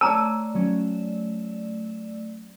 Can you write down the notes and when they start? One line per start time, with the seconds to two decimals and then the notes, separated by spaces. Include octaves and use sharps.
0.01 A3 C#5 D5 A5 A#5 D6 E6 F#6
0.54 F#3 C#4